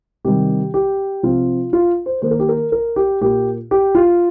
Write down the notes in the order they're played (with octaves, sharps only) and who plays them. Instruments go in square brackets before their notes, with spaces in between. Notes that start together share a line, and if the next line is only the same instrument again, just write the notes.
[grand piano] C3 D#3 G3 G4
G4
C3 F3 C4 F4
F4
C5
D#3 A#3 C5
A#4
G4
A#4
A#4
G4
A#2 A#3 G4
G4
F4